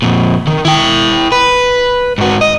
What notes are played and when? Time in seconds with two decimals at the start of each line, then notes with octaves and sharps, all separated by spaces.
0.02 F2 A#2
0.47 D#3
0.65 E4 G5
1.32 B4
2.18 G#2 F#4
2.41 D#5